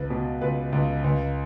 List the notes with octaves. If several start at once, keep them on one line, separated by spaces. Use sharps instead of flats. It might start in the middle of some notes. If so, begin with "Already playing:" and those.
Already playing: C#2 B4
B2
C#2 B4
C#2
C#2